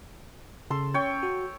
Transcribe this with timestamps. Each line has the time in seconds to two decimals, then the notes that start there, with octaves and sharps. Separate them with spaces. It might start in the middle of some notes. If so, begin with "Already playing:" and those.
0.71 C#3 A4 C6
0.94 C#4 C#5 G5
1.23 F#4